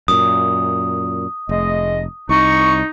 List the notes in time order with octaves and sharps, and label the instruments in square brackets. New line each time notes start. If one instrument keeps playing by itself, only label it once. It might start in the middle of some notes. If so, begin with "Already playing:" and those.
[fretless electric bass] F#2 A#2 [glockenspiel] D#6
[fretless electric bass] F1 [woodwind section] G#3 A3 D#5
[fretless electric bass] C2 [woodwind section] D#4 [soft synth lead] C#6